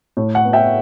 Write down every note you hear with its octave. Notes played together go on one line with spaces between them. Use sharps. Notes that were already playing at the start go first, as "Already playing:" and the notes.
A2
F#5
B3
E5 G5